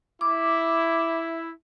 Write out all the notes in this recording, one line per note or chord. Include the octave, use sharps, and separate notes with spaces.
E4 D6